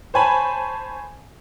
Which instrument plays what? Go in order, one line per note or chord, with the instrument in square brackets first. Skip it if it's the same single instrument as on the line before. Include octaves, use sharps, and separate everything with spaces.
[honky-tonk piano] C5 C#5 G#5 A5 B5